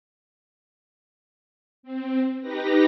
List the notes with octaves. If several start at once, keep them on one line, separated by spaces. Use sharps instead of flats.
C4
D#4 G4 B4 A#6